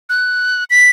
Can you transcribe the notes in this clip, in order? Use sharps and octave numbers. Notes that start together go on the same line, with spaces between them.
F#6
B6